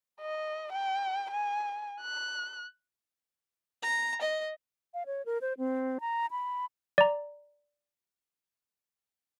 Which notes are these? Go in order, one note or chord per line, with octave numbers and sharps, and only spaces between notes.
D#5
G5
G#5
F#6
A#5
D#5
F5
C#5
A#4
C5
C4
A#5
B5
D5 A#5